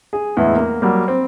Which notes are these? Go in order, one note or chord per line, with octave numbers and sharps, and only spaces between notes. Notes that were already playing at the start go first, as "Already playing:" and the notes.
G#4
E2 A2 E3 G#3
A#3
F#3 G3 A#3
C4